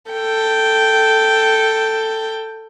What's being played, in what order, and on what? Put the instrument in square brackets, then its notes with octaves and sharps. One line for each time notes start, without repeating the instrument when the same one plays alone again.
[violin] A4 G5